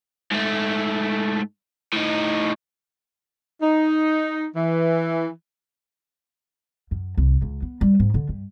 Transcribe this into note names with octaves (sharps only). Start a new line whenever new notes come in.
G#2 A3
A2 D#4
D#4
E3
F#2
C2
C#2
B3
G3
G#2
D3
G2